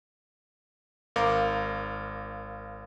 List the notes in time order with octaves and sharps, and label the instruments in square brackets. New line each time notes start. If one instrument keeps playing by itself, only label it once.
[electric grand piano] G#1 A#4 F5 D6